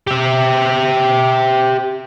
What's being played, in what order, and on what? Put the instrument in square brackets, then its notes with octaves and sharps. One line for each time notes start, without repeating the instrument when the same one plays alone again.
[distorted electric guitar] G4 E5